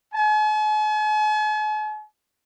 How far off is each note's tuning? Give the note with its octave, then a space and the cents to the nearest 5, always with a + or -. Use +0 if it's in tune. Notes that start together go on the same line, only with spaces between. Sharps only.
G#5 +45